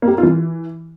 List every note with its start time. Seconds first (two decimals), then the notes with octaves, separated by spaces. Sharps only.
0.02 A#3
0.08 G4
0.13 A#4
0.18 F4
0.23 E3